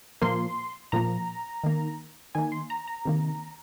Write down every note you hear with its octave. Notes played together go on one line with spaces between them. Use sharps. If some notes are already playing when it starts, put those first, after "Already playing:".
A#2 F3 A#3 C6
A#2 F3 A#3 A#5
D#3 A#3
D#3 A#3 G#5
C6
A#5
A#5
C3 D#3 A#3